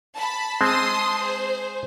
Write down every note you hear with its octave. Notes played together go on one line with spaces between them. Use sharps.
A5 B5
G#3 C4 A5 C6 D#6
G#4 C5